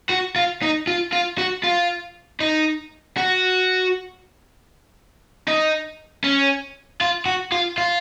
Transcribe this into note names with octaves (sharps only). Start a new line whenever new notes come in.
F#4
F4
D#4
F4
F4
F#4
F4
D#4
F#4
D#4
C#4
F4
F#4
F4
F4